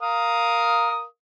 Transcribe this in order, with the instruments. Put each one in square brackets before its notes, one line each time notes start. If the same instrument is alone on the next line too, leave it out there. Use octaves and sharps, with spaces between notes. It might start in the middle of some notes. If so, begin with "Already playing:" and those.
[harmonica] A#4 F5 D#6